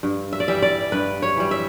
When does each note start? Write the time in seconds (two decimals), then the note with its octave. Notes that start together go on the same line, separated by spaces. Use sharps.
0.03 G2
0.33 E5
0.40 D5
0.48 E3 G3 E5
0.62 D5
0.92 G2 B4
1.22 C#5
1.37 E3 G3
1.51 E5